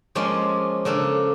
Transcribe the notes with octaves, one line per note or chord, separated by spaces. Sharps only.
F3 G#3 A#3 C#4 D5 C6
C#3 A#3 D4 A4